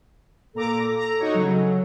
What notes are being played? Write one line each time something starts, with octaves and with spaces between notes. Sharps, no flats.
A#2 A4 A#5 D6
A#5
D#4 F#4 C#5
C#3 F#3